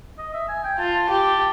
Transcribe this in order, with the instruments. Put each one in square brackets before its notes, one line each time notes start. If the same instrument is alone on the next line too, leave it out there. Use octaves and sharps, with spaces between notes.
[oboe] D#5
E5
G#5
G5
[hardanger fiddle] F4 [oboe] A5
[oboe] A5
[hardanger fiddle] G4